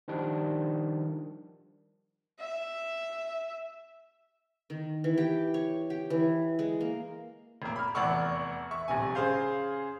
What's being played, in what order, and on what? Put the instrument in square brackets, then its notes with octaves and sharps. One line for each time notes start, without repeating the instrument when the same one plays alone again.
[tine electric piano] D#3 F3 G3 D4
[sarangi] E5
[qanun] D#3
E3
G4
C#5
G4
E3
G#3
A#3
[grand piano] F1 A#3
B5 F6
F1 E2 D5 F#5 C#6 E6
E5 C#6
D#1 A#1 C3 G#5
C#3 G#4 C5 F5 G6